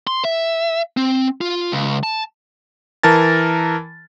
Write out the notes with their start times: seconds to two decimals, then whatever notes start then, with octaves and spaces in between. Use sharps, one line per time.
0.07 C6
0.25 E5
0.97 C4
1.41 F4
1.72 C#2
2.03 A5
3.03 E3 A#4 A5 A6